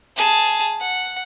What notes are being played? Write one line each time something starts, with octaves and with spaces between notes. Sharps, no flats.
G#4 A5
F#5